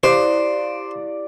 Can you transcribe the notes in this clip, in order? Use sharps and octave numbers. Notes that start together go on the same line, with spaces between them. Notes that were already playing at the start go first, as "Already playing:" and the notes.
E4 G4 C5 D5 F5